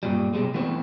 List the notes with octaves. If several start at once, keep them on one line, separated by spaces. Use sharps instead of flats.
G2 A#2 G3
B1 B2 E3 G3 G#3
E3 A3 B3 C4